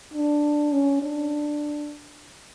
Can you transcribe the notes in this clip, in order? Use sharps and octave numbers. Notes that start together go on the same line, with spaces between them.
D4
C#4
D4